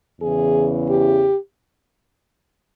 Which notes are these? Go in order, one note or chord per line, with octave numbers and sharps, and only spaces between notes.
E2 C#3 E3 G#4
G4